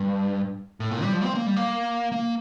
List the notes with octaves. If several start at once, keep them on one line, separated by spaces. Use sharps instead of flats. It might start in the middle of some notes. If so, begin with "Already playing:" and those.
Already playing: G2
A2
A#2
G3
F3
C4
A#3
G3
A#3
A#3